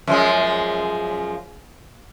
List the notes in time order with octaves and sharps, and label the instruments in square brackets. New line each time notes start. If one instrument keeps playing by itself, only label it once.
[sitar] F#2 F3 G#3